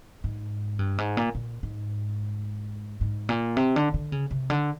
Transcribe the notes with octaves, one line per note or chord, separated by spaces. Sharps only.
G#2
G2
G#2
A#2
A#2
G#2
G#2
A#2
C3
D3
D3
C#3
C3
D3